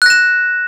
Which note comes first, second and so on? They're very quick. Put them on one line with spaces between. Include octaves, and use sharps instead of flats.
F#6 A#6 E7